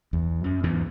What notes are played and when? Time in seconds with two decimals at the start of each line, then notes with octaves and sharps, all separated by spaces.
0.13 E2
0.44 F#2
0.64 E2 G#2